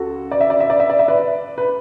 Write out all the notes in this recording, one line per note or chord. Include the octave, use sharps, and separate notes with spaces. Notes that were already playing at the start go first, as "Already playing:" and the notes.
Already playing: C#2 F#4 A4
D5
E5
D5
E5
D5
E5
D5
E5
B4 D5
B4